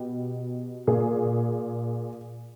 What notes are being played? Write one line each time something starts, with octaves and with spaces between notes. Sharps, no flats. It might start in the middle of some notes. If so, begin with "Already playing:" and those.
Already playing: B2 G4
A#2 G#4